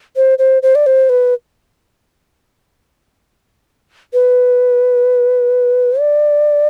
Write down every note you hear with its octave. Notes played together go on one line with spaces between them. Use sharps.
C5
C5
C5
D5
C5
B4
B4
D5